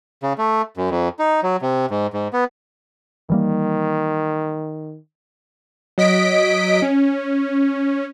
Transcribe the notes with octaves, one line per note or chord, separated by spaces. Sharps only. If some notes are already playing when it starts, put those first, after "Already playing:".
C#3
A3
F#2
F2
D#4
F#3
C3
G#2
G#2
B3
D#3 E3 G3 A#3
F#3 D#5 B6 D7
C#4